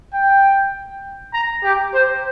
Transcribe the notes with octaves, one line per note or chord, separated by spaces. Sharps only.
G5
A#5
G4
C5